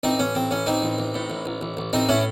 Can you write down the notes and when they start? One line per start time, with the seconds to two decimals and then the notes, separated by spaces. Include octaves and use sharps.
0.03 A1 C4 D#4
0.19 A1 C#4
0.35 A1 C4
0.51 A1 C#4
0.66 A1 C4 D#4
0.82 A1
0.98 A1
1.14 A2
1.30 A1
1.46 A1
1.61 A1
1.77 A1
1.93 A1 C4 D#4
2.09 A2 C#4 E4